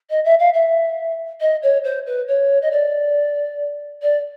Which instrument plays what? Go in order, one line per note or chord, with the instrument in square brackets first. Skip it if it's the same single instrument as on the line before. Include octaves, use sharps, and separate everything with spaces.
[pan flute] D#5
E5
F5
E5
D#5
C#5
C5
B4
C#5
D#5
D5
D5